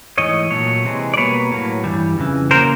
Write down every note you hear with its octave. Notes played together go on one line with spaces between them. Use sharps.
G#2 E3 A3 C#5 D#5
A#2 F#3 A3 C#5
C3 E3 G#3
D5
B2 G3 A#3 B4 C#5
A2 F#3 A#3
G2 E3 G3
F2 C#3 E3
C#3 F#3 A#3 A#4 C5